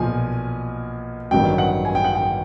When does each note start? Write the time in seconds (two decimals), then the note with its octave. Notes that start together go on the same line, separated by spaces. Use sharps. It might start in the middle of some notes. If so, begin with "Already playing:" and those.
Already playing: B1 A#2 F3 G#5
1.31 A1 G2 D#3 F#3 G5
1.58 F#5
1.85 G#5
1.95 G5
2.04 F#5
2.15 G5